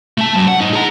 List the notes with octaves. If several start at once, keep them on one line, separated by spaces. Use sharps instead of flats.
A3 A5
F#2
F#5
G#2 D#4
G#4 A#5